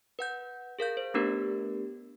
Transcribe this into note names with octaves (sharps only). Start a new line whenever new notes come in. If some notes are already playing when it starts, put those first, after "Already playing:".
B4 F#5 G6
G#4 A#4 F5 G6
C5
A3 B3 D4 G4 A#4 B4